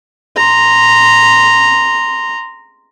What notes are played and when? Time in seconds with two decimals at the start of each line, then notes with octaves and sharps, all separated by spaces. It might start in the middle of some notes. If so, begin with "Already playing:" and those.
0.36 A#5 C6